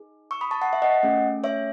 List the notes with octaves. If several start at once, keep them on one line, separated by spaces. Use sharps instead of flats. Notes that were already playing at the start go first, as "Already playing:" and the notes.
Already playing: D#4 G#4
C#6 E6
B5 D#6
A5 C#6
F#5 A5
E5
D#5 F#5
A3 C#4 G#4
C#5 E5